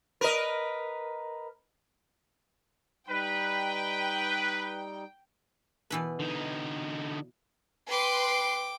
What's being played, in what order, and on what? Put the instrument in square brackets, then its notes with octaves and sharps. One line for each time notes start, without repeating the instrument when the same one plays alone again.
[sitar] A#4 B4 D#5
[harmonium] G3 D#4 [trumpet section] B4 [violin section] G5
[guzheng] B2 E3 B4
[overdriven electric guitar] D3 D#4
[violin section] B4 C6 [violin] G5 D6